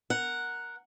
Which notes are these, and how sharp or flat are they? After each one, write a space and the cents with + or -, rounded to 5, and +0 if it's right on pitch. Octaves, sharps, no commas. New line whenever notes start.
A#4 +0 F#5 +0